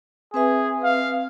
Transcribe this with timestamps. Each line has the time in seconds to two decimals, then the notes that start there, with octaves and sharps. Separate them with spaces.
0.34 C4 G#4 B4 E5
0.84 F5